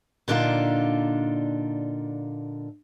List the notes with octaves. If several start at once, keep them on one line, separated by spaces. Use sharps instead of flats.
A#2 D3 D4 D#4 F4